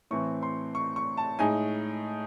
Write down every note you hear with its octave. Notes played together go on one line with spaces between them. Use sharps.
A2 E3 C4 C#6
C6
C#6
C#6
A5
A2 G#3 D#4 G#5